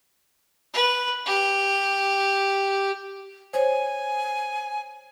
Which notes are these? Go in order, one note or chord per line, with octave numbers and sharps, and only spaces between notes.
B4
G4
C5 C#5 G#5